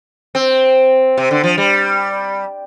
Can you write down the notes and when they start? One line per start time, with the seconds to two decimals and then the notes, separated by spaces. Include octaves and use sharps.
0.35 C4
1.17 C3
1.31 D3
1.44 F3
1.58 G3